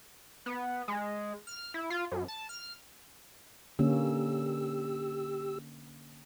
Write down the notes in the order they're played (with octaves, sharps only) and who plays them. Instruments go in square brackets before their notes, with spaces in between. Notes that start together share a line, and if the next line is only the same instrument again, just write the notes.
[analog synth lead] B3
G#3
F6
E4
F4
F#2
A5
F6
[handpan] D3 A#3 C#4 [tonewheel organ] G4 E6